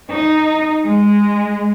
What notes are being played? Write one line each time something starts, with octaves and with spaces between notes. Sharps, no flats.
D#4
G#3